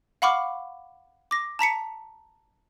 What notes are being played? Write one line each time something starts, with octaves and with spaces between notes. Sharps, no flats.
F5 F#5 B5 C#6 D6 F6
D6 A#6
A5 A#5 B6 C#7